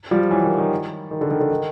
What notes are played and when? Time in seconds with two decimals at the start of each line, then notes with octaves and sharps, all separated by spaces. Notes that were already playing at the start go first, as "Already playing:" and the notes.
0.11 F3 G3
0.31 E3 F#3
0.44 D#3
0.58 D#3
1.11 D#3
1.21 D3
1.31 D#3
1.40 D3
1.51 D#3